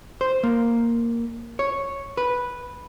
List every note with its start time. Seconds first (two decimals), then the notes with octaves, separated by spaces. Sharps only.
0.21 C5
0.43 A#3
1.59 C#5
2.17 B4